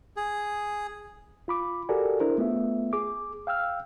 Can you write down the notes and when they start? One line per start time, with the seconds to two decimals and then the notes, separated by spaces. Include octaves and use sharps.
0.16 G#4
1.48 F4 B5 D6
1.89 F#4 G4 A4 A#4 D5 G#5
2.20 D4 E4 G#4 A#4 C5
2.38 A3 B3 F4 E5
2.93 G#4 D6
3.47 F5 G5 E6 F6